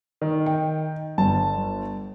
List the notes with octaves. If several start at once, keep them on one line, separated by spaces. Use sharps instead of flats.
D#3
G5
G1 A5